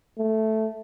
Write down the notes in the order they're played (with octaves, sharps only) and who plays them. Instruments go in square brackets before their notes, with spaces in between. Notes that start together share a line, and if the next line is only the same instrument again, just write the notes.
[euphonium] A3